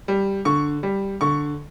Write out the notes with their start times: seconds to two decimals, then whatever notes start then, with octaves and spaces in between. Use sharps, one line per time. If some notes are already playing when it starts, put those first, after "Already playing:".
0.08 G3
0.45 D3 C#6
0.83 G3
1.21 D3 C#6